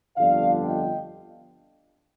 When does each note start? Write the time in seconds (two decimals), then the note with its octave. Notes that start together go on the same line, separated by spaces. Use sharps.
0.17 G1 F2 D3 D5 F5
0.64 D#5 G5